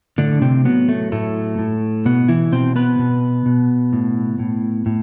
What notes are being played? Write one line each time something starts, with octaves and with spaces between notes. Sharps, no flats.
A2 D3 D4
C3 C4
F#3 B3
A3
A2 A3
A2
B2 B3
E3 E4
B2 C4 C5
B3 B4
B2
B2
A2
A2
A2